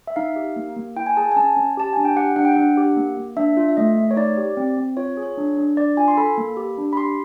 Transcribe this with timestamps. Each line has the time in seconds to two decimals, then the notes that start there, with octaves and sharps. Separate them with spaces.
0.07 E5
0.16 D#4 F5
0.36 G4
0.56 A#3
0.76 A#3
0.96 E4 G5
1.06 G#5
1.17 G#4 A5
1.32 G#5
1.36 C#4 A5
1.57 C#4
1.77 G4 A5
1.93 D4 G#5
2.05 G5
2.16 G4 F#5
2.36 D4 F#5
2.45 G5
2.53 D4 F#5
2.77 G4
2.97 A#3
3.17 A#3
3.37 D4 E5
3.57 F4
3.68 E5
3.77 A3 D#5
3.97 A3
4.11 C#5
4.16 D#4 D5
4.38 G4
4.57 C4
4.77 C4
4.97 F4 C#5
5.17 G#4
5.23 C#5
5.37 D4
5.57 D4
5.77 D4 D5
5.97 F4 G#5
6.08 C6
6.17 A4 B5
6.37 A#3
6.57 G4
6.78 D4
6.93 B5
6.97 G4 C6